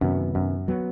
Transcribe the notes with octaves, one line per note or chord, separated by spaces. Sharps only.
F#2 C3 D#3 F#3 B3
F#2
F#3 B3